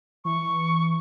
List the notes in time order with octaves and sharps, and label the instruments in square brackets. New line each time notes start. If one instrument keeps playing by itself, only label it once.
[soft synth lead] E3 [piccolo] C#6